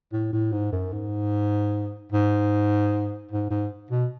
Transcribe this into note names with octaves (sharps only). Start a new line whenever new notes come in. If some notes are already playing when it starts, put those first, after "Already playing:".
A2
A2
G#2
F#2
G#2
G#2
G#2
G#2
B2